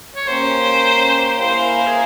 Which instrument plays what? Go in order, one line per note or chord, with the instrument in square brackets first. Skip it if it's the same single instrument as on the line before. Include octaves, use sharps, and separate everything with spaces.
[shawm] C#5
[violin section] A#3 C#4 G4 [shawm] C5
[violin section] A#3 E4 A#4 F5 G#5 [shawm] C5
[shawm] C5
G#4